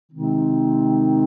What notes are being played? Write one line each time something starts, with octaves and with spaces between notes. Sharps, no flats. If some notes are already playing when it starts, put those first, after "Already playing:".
C3 D#3 G#3 C4 D#4